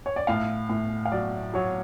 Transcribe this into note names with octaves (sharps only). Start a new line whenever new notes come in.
C#5
D5
A2 F5
A2
F5
F#3 D5
F#3 C#5